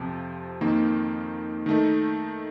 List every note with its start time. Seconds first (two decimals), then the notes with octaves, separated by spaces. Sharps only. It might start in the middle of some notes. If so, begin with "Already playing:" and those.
Already playing: F2 C3 F3
0.61 F2 D#3 A#3 D#4
1.66 D#3 A3 D#4